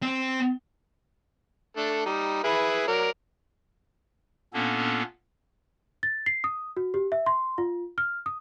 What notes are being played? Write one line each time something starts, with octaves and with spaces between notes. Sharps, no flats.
C4
A3 D4 A4
G3 D#4
E4 G#4 B4
F#3 A#4 D5
A#2 A#3 B3 C#4 D4 A4
A6
C7
D#6
F#4
G4
E5
C6
F4
F6
D#6